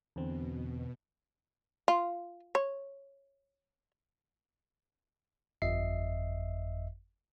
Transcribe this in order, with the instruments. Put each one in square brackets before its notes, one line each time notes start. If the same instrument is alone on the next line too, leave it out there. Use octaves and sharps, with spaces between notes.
[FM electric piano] E2 D3 C4 [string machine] B2
[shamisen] F4
C#5
[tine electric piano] G1 F2 D#5 E5 C7